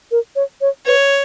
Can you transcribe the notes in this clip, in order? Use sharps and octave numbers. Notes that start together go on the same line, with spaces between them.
A#4
C#5
C#5
B4 C#5